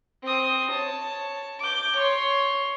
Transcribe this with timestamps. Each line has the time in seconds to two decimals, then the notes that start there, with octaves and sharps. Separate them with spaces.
0.23 C4 D#6
0.72 C#5 A5
1.60 D6 G6
1.97 C#5 C6